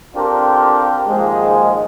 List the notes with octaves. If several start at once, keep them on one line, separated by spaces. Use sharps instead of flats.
C4 D4 F4 G4 A4 A#4
D#2 G#2 F3 G#3